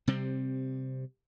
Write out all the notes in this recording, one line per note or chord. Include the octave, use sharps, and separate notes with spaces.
C3 G3 C4